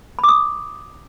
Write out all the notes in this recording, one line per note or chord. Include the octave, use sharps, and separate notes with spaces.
B5 D6 D#6